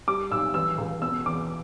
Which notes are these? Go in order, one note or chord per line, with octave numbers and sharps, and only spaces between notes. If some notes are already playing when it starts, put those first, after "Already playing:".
G3 D6
B1 E6
E3 E6
C#2
B2 E6
E2 D6